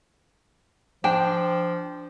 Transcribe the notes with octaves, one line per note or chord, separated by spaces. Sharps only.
F3 D4 G5